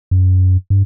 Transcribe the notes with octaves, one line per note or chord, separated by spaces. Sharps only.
F#2
G2